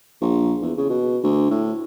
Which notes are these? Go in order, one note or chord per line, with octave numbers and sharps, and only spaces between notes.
A#1
E2
C#3
B2
D2
A2